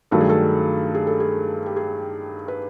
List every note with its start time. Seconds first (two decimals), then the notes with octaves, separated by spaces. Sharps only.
0.11 G2 D#3 F#3 A3 A4
0.21 G#4
0.29 A4
0.95 G#4
1.07 A4
1.20 G#4
1.66 G4
1.76 G#4
2.48 B4